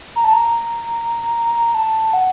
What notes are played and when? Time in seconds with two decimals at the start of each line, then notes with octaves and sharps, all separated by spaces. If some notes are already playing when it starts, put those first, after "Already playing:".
0.16 A#5
0.24 A5
0.33 A#5
1.74 A5
2.13 F#5